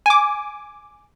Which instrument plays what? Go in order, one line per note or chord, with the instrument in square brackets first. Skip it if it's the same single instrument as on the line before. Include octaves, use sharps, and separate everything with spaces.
[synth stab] G#5 D6